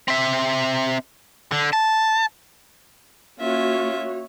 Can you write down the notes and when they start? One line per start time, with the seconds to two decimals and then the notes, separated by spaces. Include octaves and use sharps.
0.08 C4 E5
1.52 D3
1.73 A5
3.40 A#3 C#4 F4 F#4 C#5 E5